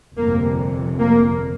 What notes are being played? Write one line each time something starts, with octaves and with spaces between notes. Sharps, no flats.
G1 F2 C3 A#3
A#3